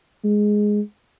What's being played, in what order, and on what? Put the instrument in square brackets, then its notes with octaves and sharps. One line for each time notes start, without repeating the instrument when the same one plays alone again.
[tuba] G#3